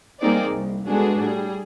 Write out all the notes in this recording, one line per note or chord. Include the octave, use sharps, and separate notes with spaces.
G3 A#3 C4 D#4 G#4 D5
C2
G#3 B3 D4 F#4 G#4 A4
A2 G3 G#4